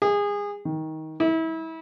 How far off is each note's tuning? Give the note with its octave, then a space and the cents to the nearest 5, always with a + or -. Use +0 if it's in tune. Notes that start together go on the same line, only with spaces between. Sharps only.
G#4 -25
D#3 +20
E4 -30